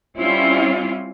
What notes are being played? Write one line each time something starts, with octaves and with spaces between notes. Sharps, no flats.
G3 C4 C#4 E4 F4